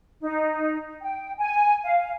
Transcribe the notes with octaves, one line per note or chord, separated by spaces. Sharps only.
D#4
G5
G#5
F5